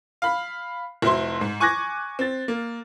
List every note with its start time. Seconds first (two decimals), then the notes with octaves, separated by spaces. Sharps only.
0.22 F5 B5
1.02 F1 F#3 E4 C5 C6
1.41 G#2
1.60 G#5 C#6 D6 F#6 G#6 A#6
2.19 C4 A6
2.48 A#3